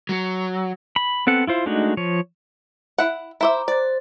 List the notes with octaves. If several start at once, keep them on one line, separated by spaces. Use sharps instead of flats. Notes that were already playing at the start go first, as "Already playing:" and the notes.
F#3
B5
B3 C4 A4 F#5
E4 F4 C5
G#3 A3 D4 D#4 F#4
F3 C#5
E4 F#5
E4 C5 E5 A#5 D6
C5 D5 A6